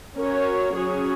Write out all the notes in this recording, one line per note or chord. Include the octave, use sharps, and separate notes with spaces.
C#4 F#4 A#4 C#5
F#3 C#4 G#4 C#5